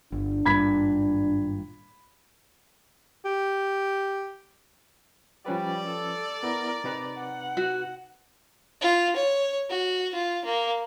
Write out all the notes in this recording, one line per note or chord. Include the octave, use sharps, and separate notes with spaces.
G1 D4
G#1 G2 A#2 B5 G#6 B6
G4
F3 G3 C#4 B4 D5
A4
B3 E4 A#4
C3 D#4 B4 A#5
F#5
F#4
F4
C#5
F#4
F4
A#3